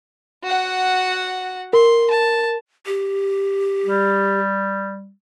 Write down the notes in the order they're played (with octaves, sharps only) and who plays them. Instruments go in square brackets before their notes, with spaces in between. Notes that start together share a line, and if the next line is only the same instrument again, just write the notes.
[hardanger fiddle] F#4 F#5
[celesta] A#4 [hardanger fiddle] C6
[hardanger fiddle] A5
[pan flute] G4
[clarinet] G3